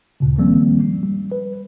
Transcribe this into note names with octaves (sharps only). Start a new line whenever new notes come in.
D2 A#2 C#3
D#3 F3 G3 A#3 C4 C#4
G3
B4